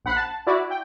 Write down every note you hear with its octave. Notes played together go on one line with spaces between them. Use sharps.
A#1 F#5 B5 F#6 C7
A5
E4 F#4 D5
G5